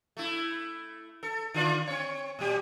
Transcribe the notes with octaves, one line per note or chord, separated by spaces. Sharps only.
A3 E4
A4
D3 F4 D5
C4 C#5
A#2 G3 G4